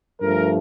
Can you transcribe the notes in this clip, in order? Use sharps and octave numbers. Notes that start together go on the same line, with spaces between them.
G2 F3 A3 A#4